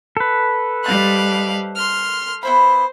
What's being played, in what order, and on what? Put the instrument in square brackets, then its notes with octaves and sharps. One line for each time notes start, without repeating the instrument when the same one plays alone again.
[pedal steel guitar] A4 B4
[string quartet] G3 F5 F#6 [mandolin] C5 D#5 A5
[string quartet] C6 F6
[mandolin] B3 E4 B5 [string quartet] C5